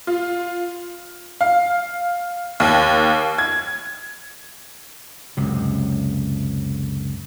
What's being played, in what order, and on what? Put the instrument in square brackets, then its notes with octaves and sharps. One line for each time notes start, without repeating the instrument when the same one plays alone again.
[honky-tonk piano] F4
F5
D#2
G#6
[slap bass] C#2 F#2 C3